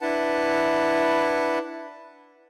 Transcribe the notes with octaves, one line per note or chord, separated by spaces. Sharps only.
D4 E4 B4 F#5 A5